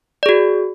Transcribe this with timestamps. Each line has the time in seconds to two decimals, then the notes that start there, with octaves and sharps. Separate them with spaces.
0.23 D5
0.26 G#4
0.29 F#4